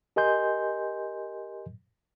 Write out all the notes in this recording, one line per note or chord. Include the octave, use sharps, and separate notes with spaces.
G4 A#4 D#5 G#5 C6 G6